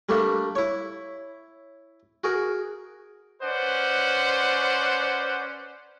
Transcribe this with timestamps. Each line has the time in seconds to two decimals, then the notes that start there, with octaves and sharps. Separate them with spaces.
0.09 G3 A3 A#3 D4
0.55 E4 C#5
2.24 F#4 G#4 A#4
3.42 C#4 B4 C5 D5 F#5